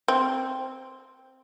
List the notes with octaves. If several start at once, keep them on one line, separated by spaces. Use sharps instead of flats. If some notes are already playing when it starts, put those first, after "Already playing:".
C4